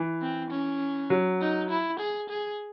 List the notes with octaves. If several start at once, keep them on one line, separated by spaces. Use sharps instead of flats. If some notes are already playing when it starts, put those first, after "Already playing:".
Already playing: E3
C4
C#4
F#3
D#4
E4
G#4
G#4